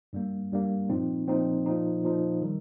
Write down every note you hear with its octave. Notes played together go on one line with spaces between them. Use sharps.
G2 G3 A#3
G2 G3 A#3
A#2 F3 C4 D#4
A#2 F3 C4 D#4
A#2 F3 D#4
A#2 F3 D#4
D#3 G3